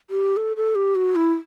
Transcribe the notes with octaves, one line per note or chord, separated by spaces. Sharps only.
G4
A4
A4
G4
F#4
E4